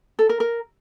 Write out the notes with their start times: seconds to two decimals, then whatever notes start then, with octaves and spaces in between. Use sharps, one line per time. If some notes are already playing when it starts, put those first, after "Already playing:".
0.19 A4
0.29 A#4
0.40 A#4